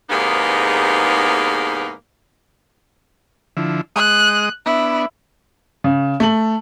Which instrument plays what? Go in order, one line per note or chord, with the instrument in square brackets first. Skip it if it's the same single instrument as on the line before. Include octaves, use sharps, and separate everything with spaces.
[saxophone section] E2 G#2 C3 A#3 B3 D#4
[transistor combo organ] D3 F3 E4
[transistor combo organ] G#3 D#5 D#6 [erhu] F#6
[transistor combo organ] B3 D4 [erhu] E4
[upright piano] C#3
A3 F#7